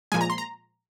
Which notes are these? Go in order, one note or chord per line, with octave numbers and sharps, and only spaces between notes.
A#2 F3 G#3 G#5
A#5
C6
A#5